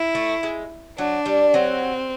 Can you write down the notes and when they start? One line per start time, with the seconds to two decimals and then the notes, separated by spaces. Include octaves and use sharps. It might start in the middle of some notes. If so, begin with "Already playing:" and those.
Already playing: E4
0.15 A3
0.43 G#3
0.98 F#3 D4
1.26 G3
1.54 F#3 C4